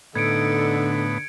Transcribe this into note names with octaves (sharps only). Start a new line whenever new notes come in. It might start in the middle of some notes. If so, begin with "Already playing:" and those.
A2 D3 B3 D#4 A4 G#6 C#7 D7